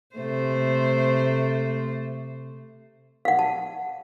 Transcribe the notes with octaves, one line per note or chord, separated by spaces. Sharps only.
C3 A3 C5
F5 F#5
A5